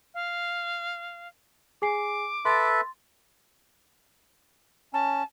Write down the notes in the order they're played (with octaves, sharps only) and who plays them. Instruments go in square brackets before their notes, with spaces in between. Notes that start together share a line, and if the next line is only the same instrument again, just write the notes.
[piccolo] F5
[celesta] G#4 G#5 C7 [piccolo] D6
[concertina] A4 B4 E5 [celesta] C6 A6
[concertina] C#4 [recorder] A5